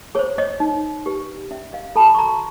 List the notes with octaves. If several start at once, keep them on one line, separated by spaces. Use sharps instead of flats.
G#4 C5 C#5
C#5 D#5
D#4
G4 B4
C#4 D5 E5
D#5 F5
F#4 A4 A5 B5
C#6
A#5 C6